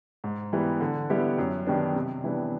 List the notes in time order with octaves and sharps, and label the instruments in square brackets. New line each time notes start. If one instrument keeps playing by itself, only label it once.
[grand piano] G#2
E3 G3 B3
D3
G3 B3 E4 G4
F#2
D#3 G3 B3 D4
C3
E3 G3 B3 D4